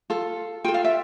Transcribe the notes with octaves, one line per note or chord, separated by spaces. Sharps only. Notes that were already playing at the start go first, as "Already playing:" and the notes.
F4 A4
F4 A4 G5
F5
E5